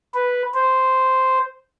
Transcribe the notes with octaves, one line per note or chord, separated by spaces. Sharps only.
B4
C5